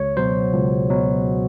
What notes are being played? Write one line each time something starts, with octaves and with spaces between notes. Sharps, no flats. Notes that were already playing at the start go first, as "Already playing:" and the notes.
Already playing: C#2 C#5
B2 F#3 C5
C#2
B2 F#3